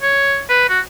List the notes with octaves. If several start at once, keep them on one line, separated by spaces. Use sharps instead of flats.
C#5
B4
F#4